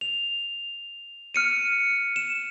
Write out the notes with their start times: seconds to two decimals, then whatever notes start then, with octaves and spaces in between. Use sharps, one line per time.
0.01 F7
1.34 F6 C#7 D#7
2.16 E7